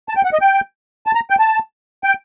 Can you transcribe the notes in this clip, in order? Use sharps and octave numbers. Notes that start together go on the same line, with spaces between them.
A5
G5
F#5
D#5
G5
A5
A#5
G5
A5
G5